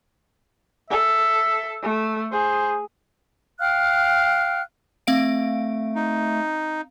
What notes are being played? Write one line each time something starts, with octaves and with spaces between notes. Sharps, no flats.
A4 E5
A3
G#4 C5
F5 G5 F6 F#6
A3 C4 F5 D7
D#4